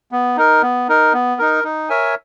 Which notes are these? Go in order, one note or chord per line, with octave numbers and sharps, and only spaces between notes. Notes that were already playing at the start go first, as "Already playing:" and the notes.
B3
D#4 A#4
B3
D#4 A#4
B3
D#4 A#4
D#4
A#4 C#5 E5 G#5